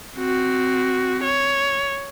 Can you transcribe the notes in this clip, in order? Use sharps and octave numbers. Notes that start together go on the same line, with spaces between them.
C4 F#4
C#5